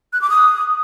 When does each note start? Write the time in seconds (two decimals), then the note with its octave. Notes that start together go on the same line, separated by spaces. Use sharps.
0.13 F#6
0.21 D6
0.30 D#6